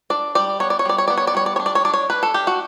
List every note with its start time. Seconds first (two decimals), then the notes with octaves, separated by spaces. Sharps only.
0.10 D4 D5
0.35 G3 D5
0.60 B3 C#5
0.70 D5
0.79 C#5
0.85 G3 D5
0.98 C#5
1.08 B3 D5
1.17 C#5
1.27 D5
1.34 G3 C#5
1.46 D5
1.56 C#5
1.60 D4
1.66 D5
1.75 C#5
1.85 D4 D5
1.94 C#5
2.10 D4 B4
2.23 A4
2.34 D4 G4
2.47 F#4